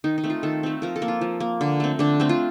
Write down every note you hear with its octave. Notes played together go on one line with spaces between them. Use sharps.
D#3 D#4
D#4
A3 C4
F4
D#3 A4
A3 C4
F3 A#4
A4
A#3
F4
F3
A#3
D3
A3 C4
D3 D4
A3 C4
F4